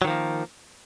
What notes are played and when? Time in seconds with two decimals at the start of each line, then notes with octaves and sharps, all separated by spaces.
0.02 F#3
0.04 D#3
0.07 F3
0.10 A#3